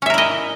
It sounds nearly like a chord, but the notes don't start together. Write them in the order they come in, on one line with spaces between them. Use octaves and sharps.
C#4 E5 A#4 E4 D#5